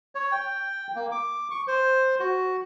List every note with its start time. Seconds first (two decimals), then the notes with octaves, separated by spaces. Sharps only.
0.15 C#5
0.32 G5
0.95 A#3
1.12 D6
1.51 C#6
1.67 C5
2.20 F#4